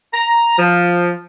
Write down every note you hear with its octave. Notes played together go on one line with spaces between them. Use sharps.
A#5
F3